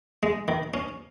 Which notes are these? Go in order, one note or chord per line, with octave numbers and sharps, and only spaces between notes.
G#3
D#3
C#4